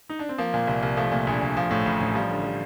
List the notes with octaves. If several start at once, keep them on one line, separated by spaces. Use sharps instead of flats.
D#4
D4
C4
F3 A#3
A#2
C2
C2
F3 A3
A#2
A#1
A#1
F3
A2
A1
A1
F3 G3
D3
G3